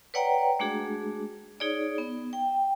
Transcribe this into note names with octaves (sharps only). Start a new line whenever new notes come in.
B4 C#5 D5 F#5 G5 A#5
G#3 A3 D4 F#4 G#4
D#4 G#4 C#5 D5
B3
G5